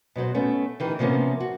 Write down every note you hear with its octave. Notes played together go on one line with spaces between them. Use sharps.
B2 F#3 F#4 C5
A3 B3 C#4
D#3 E3 G4
C3 F3 A#3 B3 C#4
F#4